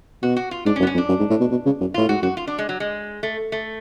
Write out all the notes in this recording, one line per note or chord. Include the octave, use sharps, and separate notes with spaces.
B2 F#4
F#4
F4
G#2 D4
C#4
F#2
B3
C#4
F2
D4
F#2
G#2
A2
B2
B2
C#3
F#2
A2 F4
G#2 F#4
F#2 F#4
F4
D4
G#3
F#3
G#3
A3
A3